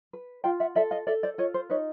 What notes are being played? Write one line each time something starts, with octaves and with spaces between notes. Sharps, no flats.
B4
F4 F5 G5
E5 F#5
A4 D5 E5
D#5 F5
A4 D5 E5
C5 D5
F4 C#5 D#5
C5
D#4 B4 C#5